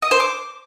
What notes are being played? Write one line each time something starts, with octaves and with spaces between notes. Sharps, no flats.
D#5
C5
D6